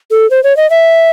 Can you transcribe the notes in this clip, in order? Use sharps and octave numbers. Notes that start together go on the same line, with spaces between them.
A4
C5
C#5
D#5
E5